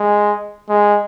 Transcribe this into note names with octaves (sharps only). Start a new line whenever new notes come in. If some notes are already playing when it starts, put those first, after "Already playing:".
Already playing: G#3
G#3